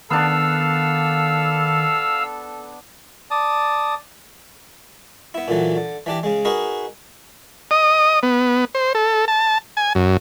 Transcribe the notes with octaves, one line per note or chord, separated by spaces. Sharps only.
D#3 B3 D4 A4 F5 E6
D5 A5 D#6
B3 E4
A#2 D3 E3 F#3
D3
E3 D4 G4
C#3 G#3
D#4 F#4 G#4 A#4 B4 D#5
D#5
B3
C5
A4
A5
G#5
F#2